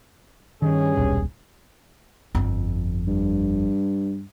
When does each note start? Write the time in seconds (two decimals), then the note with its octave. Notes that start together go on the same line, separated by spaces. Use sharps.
0.62 G2 D#3 C#4 G#4
0.97 D#1 B1
2.35 G1 F2
3.07 G2